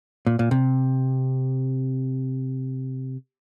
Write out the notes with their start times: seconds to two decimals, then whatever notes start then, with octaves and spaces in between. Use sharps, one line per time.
0.27 A#2
0.39 A#2
0.51 C3